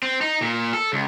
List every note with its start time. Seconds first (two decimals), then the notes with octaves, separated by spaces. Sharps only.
0.02 C4
0.21 D#4
0.42 A#2
0.74 A4
0.93 C#2